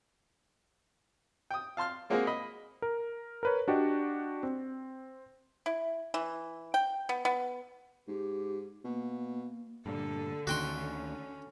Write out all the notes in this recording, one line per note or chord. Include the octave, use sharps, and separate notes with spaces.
G5 D#6
F5 A5 C6 F6
G#3 A#3 C4 F#4 G#4 A#4
D#5 B5
A#4
A#4 B4 C#5
D4 F#4 G4 D5 D#5
C4
E4
E3
G5
B3
B3
G#2 G4
B2 A#3
G2 A#2 D3 A4
D2 D#3 C#4 F#4 G5 C6